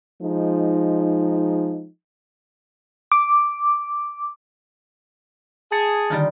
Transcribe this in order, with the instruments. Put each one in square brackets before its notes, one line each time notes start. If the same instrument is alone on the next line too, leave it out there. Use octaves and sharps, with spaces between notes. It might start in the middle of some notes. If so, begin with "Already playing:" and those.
[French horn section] F3 G#3 D#4
[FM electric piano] D6
[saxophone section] G#4 [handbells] A5 A6 C#7
[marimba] D3 D#3 [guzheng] G3 D#4 F4